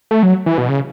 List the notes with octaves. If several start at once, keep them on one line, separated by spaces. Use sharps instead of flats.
A3
F#3
E3
B2
C#3